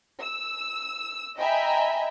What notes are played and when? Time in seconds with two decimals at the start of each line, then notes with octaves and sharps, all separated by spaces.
0.22 E6
1.38 D#5 E5 G5 G#5 A#5 B5